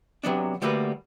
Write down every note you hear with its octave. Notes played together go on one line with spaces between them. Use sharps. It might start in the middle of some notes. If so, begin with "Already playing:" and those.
C3 F#3 B3 D4
D3 G3 A3 A#3 F#4 B4